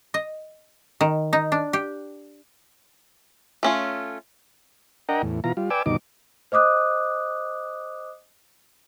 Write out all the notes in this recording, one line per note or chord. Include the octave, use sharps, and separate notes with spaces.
D#5
D#3
D#4
D4
G4
A3 C#4 F4
D4 A#4 D#5 F#5 G5 A#5
E2 A2
B2 E3 F4 A#5
G3 F4
B4 D5 G5 G#5 D6 E6
D2 G2 B2 D#3 D#4 D6
C5 D#5 D6 D#6 F#6